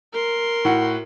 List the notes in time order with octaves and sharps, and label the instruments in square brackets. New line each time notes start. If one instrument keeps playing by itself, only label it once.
[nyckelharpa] A#4 C6
[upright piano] A2 F#4 F#5